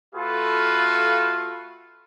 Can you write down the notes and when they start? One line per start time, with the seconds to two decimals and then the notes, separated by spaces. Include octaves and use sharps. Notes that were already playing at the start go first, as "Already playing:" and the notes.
0.15 A3 F4 F#4 A4 B4 F5